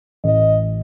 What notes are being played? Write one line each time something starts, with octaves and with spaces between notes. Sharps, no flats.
A1 D#5